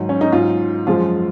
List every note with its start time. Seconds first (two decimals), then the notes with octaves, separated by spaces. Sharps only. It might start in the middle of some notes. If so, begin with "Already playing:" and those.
Already playing: G#2 D#3 F#3
0.09 C#4
0.21 D#4
0.32 G#2 F#3 F4
0.87 F#2 F3 G#3 F4